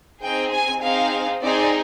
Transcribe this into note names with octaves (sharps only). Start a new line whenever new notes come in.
C4 D#4 G#4 G5
G#5
C4 D#4 G#4 F5
C4 D#4 G#4 D5